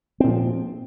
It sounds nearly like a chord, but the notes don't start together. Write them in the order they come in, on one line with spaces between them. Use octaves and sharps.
C4 A#2 F3